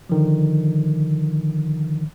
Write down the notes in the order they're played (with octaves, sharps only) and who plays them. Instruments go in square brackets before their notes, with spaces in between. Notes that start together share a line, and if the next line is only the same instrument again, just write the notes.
[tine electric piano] D3 D#3 F3